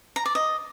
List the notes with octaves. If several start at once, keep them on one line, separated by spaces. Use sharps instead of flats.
A#5
D5
D#5